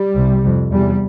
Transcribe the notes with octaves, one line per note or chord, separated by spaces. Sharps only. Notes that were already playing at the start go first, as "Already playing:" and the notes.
Already playing: G3
C2 C3
F2 C3
E2 C3 G3